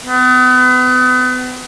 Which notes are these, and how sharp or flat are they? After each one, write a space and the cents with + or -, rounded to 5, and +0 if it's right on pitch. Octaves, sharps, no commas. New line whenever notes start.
B3 +35